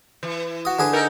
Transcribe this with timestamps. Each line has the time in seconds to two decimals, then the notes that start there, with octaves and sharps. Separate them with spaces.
0.23 E3
0.65 F#4 D#6
0.79 D3 G#4 B4
0.93 D#4 A4 A#4